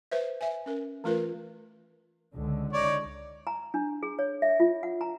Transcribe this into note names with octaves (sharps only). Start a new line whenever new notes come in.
B4 C5 E5
E5 G#5
C#4 A#4
E3 A3 F4 A#4 B4
C#2 D3
D#4 C#5 D5
A#5
D4
G#4
C#5
E5
F4
F#5
A#5